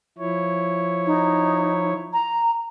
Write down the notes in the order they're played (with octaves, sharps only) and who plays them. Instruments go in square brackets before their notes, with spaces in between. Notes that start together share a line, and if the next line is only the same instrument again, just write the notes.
[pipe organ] F3 E4 C#5
[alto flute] D#4
A#5